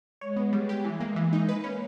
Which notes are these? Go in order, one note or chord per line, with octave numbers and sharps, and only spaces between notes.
G#3 C#5
B3
G3
G4
E3
A#3
E3
D#4
A#3 B4
C#4